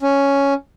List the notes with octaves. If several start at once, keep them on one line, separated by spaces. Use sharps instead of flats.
C#4